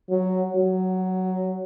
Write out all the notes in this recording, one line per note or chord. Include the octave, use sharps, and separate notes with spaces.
F#3
F#3